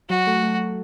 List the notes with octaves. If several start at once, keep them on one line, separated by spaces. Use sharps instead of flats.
F#3 F#4
A3
A3